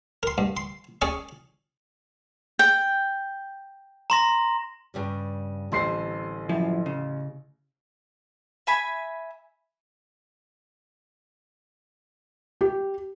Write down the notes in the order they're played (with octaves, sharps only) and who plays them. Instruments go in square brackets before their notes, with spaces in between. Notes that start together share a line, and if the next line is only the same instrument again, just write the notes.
[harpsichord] A#4 C6
G2
C6
C#4 G#4 D5 C#6
[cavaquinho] G5
[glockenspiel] A#5 C6 A#6
[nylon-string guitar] G2 C#3 G3
[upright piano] A1 C6 C7 [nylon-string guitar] D3 G3 C4
[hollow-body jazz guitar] F#2 F3 E4
C#3
[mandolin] E5 G#5 B5
[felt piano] G4